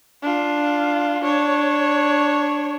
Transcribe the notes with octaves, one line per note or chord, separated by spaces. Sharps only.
D4 F4
D4 C#5